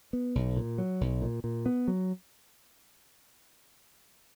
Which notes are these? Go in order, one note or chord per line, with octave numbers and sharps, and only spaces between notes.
B3
B1
A#2
F#3
B1
A#2
A#2
B3
F#3